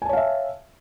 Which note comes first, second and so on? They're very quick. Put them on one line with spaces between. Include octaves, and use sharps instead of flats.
G#5 A5 C#5 F5 E5